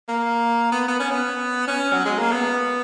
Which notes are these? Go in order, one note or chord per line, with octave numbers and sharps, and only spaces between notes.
A#3
B3
B3
C#4
B3
C#4
F#3
G#3
A#3
B3